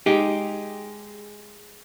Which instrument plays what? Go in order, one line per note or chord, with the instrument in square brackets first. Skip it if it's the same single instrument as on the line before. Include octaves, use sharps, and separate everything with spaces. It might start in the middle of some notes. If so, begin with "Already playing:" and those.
[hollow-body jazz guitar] G#3 D#4 G4